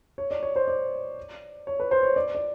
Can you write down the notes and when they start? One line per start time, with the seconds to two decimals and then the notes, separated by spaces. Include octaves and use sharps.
0.18 C#5
0.31 D5
0.43 C#5
0.56 C5
0.68 D5
1.67 C#5
1.80 B4
1.91 C5
2.03 C#5
2.16 D5
2.35 D5